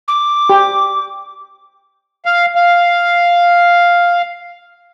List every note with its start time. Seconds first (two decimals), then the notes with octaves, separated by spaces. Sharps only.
0.08 D6
0.49 G4
2.26 F5
2.55 F5